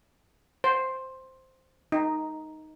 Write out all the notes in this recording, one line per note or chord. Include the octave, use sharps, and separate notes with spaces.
C5
D#4